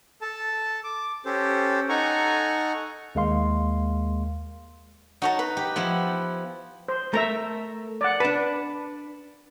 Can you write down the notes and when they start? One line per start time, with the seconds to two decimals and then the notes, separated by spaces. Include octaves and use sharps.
0.22 A4 A5
0.84 D6
1.25 C#4 G4 A4 C5
1.89 D#4 A4 F#5 G#5 A#5 C#6
3.15 D#2 G#3 A#3 F5 C6
5.22 D#4 F#4 C#5 A5
5.39 B4
5.57 G4
5.76 F3 B3 E4
6.88 C5
7.14 A3 A#4 E5 A#5
8.01 D5 F#5
8.20 D4 B4 A5